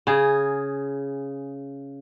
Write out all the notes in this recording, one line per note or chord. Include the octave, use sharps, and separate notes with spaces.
C#3 G#4